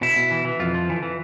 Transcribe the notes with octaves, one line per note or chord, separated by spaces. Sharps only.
B2 E4
B2
E3
E3
F2 F4
F3
E3
E3